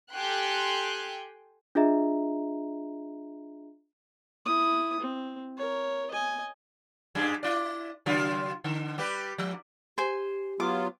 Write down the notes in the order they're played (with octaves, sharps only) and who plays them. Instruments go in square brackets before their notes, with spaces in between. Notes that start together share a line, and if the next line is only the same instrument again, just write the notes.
[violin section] G4 A4 G5 G#5 C6 F#6
[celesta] D4 F4 G#4 D#5 E5 A#5
[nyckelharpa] E4 D#6
C4
A#4 C#5
D#5 G#5
[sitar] F#2 G3 G#4
E4 D5
C#3 F#3 F4
D3
G3 G4 B4
F3
[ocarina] G4 [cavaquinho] C5 G#5
[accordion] F#3 B3 F4 [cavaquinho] D6